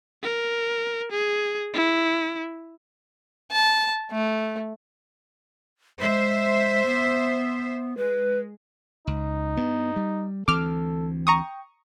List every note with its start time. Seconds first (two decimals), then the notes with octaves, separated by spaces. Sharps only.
0.23 A#4
1.12 G#4
1.74 E4
3.52 A5
4.11 A3
6.00 G#3 C5 E5
6.85 B3
7.97 G#3 B4
9.07 C#2 D#4
9.57 G2 B3
9.96 G3
10.48 D2 E3 C4 A4 D6 F6
11.27 G5 A#5 C#6 D#6